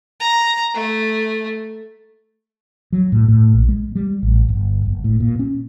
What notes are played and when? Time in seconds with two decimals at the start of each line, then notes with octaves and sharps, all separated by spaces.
0.20 A#5
0.74 A3
2.93 F#3
3.12 A2
3.28 A2
3.53 A#1
3.69 G#3
3.95 G3
4.23 A1
4.49 G1
4.85 F#1
5.04 A2
5.20 A#2
5.39 C#4